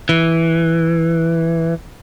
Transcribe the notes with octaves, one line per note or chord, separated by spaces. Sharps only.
E3